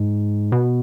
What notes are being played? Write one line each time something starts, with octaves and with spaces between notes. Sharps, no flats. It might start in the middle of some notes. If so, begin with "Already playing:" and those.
Already playing: G#2
B2